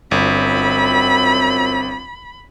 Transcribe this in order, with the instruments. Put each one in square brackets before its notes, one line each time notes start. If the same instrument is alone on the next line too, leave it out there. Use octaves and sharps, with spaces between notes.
[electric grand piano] G1 [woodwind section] F#2 F3 C4 [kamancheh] B5